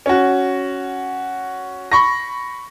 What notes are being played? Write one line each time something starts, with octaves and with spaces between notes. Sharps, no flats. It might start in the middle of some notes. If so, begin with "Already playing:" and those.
C#4 F#4
B5 C#6 A#6